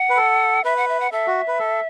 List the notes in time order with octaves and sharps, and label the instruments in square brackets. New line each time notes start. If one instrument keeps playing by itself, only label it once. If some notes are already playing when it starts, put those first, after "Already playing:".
Already playing: [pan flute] F#5
[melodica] B4
A4
[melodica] B4 [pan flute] E5
[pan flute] F#5
E5
F#5
[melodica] A4 [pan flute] E5
[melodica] F#4
B4
A4